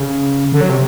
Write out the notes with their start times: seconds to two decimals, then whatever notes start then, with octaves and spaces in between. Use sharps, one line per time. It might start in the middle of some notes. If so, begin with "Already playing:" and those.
Already playing: C#3
0.52 D3
0.61 F#3
0.70 C3